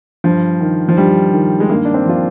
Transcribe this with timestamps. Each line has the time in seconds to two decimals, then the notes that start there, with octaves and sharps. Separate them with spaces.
0.24 G2 F3
0.61 D#3
0.89 F3
0.97 G2 G3
1.33 D#3
1.60 G#3
1.70 G2 A#3
1.85 D4
1.94 C4
2.06 F3 F4